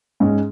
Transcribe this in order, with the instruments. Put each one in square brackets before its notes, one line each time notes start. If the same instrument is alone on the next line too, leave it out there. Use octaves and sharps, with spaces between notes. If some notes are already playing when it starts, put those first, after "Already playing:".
[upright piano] G#2 G#3 C#4